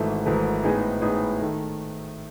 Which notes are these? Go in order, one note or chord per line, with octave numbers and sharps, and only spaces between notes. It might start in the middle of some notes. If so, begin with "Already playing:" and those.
Already playing: G#1 G#2 E3 A3
G#1 G#2 E3 A3
A2 G#3 B3 D#4 G#4
A2 G#3 B3 D#4 G#4
D#3 A3